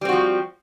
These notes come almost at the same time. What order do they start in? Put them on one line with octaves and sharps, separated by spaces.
G3 C4 F#4 F3